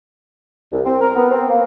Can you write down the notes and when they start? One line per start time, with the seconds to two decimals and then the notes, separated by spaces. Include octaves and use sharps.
0.72 C2
0.85 C4
1.01 A#4
1.16 B3
1.31 C4
1.49 A#3